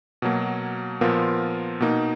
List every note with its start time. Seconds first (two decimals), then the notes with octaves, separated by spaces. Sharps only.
0.22 B2 F#3 A#3
1.01 A#2 F3 B3 F4 A#4
1.80 B2 A#3 D#4